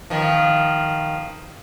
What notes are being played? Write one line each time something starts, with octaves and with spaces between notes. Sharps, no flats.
D#3 F3